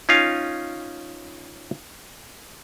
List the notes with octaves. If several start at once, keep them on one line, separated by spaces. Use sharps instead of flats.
C#4 D#4 F4 F5 G#5